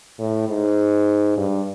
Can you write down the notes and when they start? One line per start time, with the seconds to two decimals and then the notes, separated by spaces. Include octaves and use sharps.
0.20 A2
0.49 G#2
1.37 G2